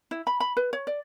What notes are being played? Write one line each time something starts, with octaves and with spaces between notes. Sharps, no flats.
E4
B5
B5
B4
C#5
D5